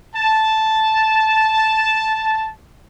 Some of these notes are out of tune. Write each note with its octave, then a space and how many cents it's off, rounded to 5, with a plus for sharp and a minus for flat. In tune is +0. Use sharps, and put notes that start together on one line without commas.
A5 -5